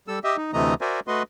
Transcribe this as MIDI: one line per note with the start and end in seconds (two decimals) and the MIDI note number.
0.08 0.19 55
0.08 0.19 69
0.08 0.19 88
0.24 0.37 67
0.24 0.37 75
0.24 0.37 76
0.37 0.51 63
0.53 0.74 38
0.53 0.74 48
0.53 0.74 52
0.53 0.74 57
0.53 0.74 75
0.53 0.74 82
0.81 1.00 66
0.81 1.00 70
0.81 1.00 72
0.81 1.00 74
0.81 1.00 76
0.81 1.00 80
1.07 1.23 57
1.07 1.23 66
1.07 1.23 71
1.07 1.23 75
1.07 1.23 84